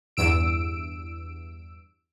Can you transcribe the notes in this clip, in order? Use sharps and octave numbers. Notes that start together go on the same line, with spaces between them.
E2 G2 E6 D7